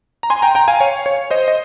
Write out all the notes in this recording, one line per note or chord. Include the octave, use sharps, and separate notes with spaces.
A#5
G#5 C6
G5 A#5
G5 A#5
F5 G#5
C#5 F5
C#5
C5 D#5
D#5